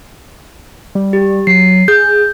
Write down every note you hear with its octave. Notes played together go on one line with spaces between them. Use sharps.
G3
G4
F#3 C7
G#4 G6